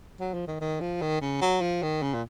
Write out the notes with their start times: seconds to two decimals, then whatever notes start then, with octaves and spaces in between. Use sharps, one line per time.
0.20 F#3
0.34 F3
0.47 D#3
0.61 D#3
0.81 F3
1.01 D#3
1.21 C#3
1.42 F#3
1.61 F3
1.82 D#3
2.02 C#3
2.14 A#2